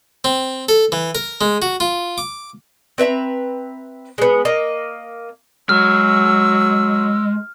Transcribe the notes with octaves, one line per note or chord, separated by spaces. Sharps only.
C4
A4
E3
A#4
G#3
F#4
F4
D6
C4 B4 E5 A#5
G#3 B3
A#3 D#5
F#3 G#3 E6 F6